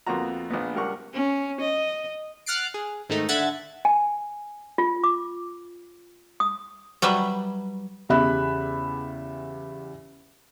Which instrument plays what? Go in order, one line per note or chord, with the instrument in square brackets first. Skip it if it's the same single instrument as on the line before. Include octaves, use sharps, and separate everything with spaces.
[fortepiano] F2 A#3 B3 F4 F#4 A#5
A#1 B3
C#2 G3 A#4 F#5 C#6
[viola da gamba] C#4
D#5
[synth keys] F#5 F6 F#6 A6 C7 D7
G#4
G#2 D#3 A3 D#4
D3 E5 F#5 F#6 G#6 A6
[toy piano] G#5
F4
D6
D#6
[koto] F#3 G3 B4 E5
[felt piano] E2 C#3 G4 E5 B5 F#6